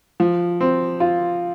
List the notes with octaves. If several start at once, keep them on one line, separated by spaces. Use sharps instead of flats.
F3
C4
F4